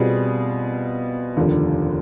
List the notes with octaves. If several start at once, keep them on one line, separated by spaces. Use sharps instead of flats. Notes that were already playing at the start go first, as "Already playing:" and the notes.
Already playing: B2 G3 C4 F4 G#4
F1 D#2 D3 F3